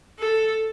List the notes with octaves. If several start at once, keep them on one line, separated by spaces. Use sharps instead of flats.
A4